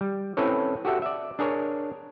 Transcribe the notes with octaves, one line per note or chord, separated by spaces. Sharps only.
G3
C4 C#4 E4 A4 B4 C#5
F#4 G4 A4 E5 F#5
D5 E5
D4 G#4 A#4 C#5